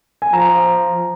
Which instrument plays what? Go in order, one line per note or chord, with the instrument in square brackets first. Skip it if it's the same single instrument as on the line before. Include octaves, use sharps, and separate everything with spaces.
[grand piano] G#5
[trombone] F3 [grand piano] A#5